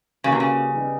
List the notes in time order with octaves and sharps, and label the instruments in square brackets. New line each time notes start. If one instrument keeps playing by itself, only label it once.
[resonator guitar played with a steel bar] C#3 [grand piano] G3 A#3 C#4 F#4 B4
[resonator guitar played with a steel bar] C3
C#3
[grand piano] G3 B3 D#4